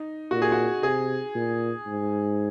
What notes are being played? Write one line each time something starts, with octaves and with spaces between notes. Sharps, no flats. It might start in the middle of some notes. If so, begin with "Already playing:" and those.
Already playing: D#4
A#2 F#4
G#4
F#4
C3 G#4
A#2
G#2